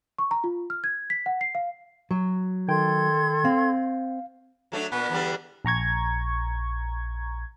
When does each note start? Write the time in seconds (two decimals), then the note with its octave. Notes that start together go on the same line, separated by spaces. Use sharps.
0.18 C#6
0.31 A#5
0.44 F4
0.70 F6
0.84 G#6
1.10 B6
1.26 F#5
1.41 C7
1.55 F5
2.11 F#3
2.68 D#3 A4 G5 C6 G#6
3.45 C4 F5
4.72 F#3 A3 D4
4.92 A#2 B3
5.10 E2 D3 G3
5.65 A#1 A#5 C#6 G#6